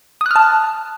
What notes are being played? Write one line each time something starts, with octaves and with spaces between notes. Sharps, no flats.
A5 D#6 F6 F#6